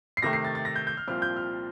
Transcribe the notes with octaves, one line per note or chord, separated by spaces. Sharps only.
C7
C3 D#3 A3 A#6
C7
A6
A6
A#6
G6
G6
F6
C2 A#2 F3 C4 F4 F6
G6
F6